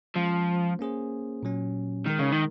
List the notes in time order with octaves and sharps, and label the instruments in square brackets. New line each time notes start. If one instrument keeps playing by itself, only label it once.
[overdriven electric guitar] F3 [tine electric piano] G#3 C#4 F4 C5
[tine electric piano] A#3 C#4 G#4 C5
A#2 F#3 C#4
[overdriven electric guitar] D#3 [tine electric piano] G#3 D#4 A#4
[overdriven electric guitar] C#3
D#3